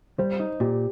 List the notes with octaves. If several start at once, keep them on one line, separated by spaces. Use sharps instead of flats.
G3 C5
D#4
A#2 G4